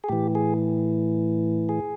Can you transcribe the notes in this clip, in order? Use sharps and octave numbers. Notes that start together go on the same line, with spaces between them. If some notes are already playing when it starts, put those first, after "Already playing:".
G#4
A2 E3 G4
G#4
G#4